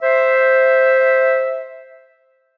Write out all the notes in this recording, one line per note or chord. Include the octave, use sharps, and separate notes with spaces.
C5 E5